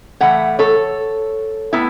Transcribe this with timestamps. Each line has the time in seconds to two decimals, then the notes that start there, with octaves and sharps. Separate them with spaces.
0.20 A2 E3 A3 C#5 F#5
0.59 A4 C#5
1.73 A2 B3 E4